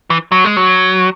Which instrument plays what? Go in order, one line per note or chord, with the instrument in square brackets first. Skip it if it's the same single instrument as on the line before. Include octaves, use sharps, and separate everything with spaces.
[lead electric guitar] E3
F#3
G#3
F#3